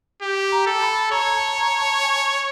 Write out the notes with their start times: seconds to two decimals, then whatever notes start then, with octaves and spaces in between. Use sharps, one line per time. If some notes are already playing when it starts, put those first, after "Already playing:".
0.22 G4
0.52 A#5
0.67 A4
0.82 B5
1.12 C#5 A#5
1.27 A#5
1.35 A5
1.58 A#5
1.81 A5
2.03 G#5